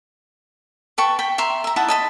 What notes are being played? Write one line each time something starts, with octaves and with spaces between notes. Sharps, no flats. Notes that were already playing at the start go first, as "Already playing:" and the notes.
B4 G5 A5 C#6
G5 B5
E5 A#5 C6
E5 A#5
D#4 E4 F#5 A5
D#5 A5 B5